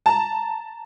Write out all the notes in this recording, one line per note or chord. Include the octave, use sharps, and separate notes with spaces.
A5 A#5